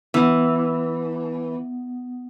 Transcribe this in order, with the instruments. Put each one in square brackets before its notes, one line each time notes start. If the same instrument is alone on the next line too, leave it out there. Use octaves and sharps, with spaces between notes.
[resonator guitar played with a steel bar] E3 [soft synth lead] B3